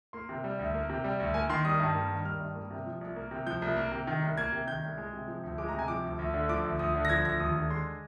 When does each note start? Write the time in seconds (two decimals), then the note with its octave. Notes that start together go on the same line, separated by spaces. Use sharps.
0.13 A#3 C6
0.29 C3
0.44 G3
0.59 D2
0.74 A#3
0.89 C3
1.04 G3
1.20 D2
1.34 A#3 G#5
1.49 D#3 C6
1.65 G3 D#6
1.80 G2
1.95 A#3
2.10 D#3
2.25 G3 F6
2.40 G2
2.56 A#3
2.70 C3
2.86 F3
3.01 C2
3.16 A#3
3.31 C3
3.47 F3 G6
3.62 C2
3.76 A#3
3.91 C3
4.07 D#3
4.22 C2
4.37 A#3 G#6
4.52 C3
4.67 D#3 G6
4.83 C2
4.98 G#3
5.13 C3
5.28 F3
5.43 D2
5.58 G#3 D6
5.68 A#5
5.74 C3 G#5
5.88 F3 D6
6.04 D2
6.19 D2
6.34 D3
6.49 F3 D6
6.65 D2
6.79 D2 D#6
6.95 D3
7.05 A#6
7.10 F3 G#6
7.25 D2 A#6
7.40 D#2 D#6
7.55 D3
7.70 G#3 C6